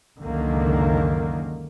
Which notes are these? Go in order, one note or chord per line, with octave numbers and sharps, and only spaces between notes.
C#2 F#2 D3 D#3 A#3